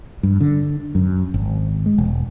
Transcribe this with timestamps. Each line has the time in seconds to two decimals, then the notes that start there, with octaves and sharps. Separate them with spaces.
0.23 G2
0.40 D3
0.95 F#2
1.34 G#1
1.86 G#3
1.98 E1